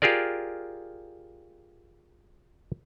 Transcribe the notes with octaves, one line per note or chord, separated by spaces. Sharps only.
F4 G4 G#4 A#4 D5